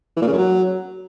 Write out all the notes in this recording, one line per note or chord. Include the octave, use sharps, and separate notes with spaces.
E3
A#2
C#3
F#2
F#3